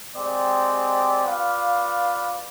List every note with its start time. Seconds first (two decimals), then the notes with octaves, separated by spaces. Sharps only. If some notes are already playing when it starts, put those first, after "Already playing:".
0.15 G#3 C4 G4 D5
1.23 F4 B4 D5 F5